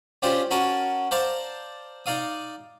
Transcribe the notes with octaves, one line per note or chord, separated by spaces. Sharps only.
C#4 D4 F4 G4 C5 D5
C#4 F#4 A#4 A5 D#6
C5 D5 F5 A5 A#5
D#4 D5 F5 D#6